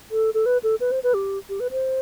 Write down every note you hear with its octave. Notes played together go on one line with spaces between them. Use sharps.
A4
A4
B4
A4
B4
C5
B4
G4
G4
B4
C5